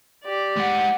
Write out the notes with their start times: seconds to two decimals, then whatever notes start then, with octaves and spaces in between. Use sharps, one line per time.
0.24 G4 D5
0.56 G#3 F#5